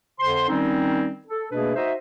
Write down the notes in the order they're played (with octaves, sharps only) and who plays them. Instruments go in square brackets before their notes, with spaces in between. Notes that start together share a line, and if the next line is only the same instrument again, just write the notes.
[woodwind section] F2 D3 C5 C6
D#3 G3 C4 C#4 D#4
A4
B2 A3 A#3 D4 G#4 B4
D#4 F#4 C5 D#5 E5